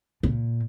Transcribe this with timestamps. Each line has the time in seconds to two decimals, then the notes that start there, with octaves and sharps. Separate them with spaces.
0.23 A#2